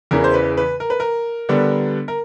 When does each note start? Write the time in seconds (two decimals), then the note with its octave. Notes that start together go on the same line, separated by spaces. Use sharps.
0.11 E2 C#3 E3 A#4
0.24 C5
0.34 B4
0.57 B4
0.80 A#4
0.90 B4
1.00 A#4
1.49 D3 G3 B3 D4
2.08 A#4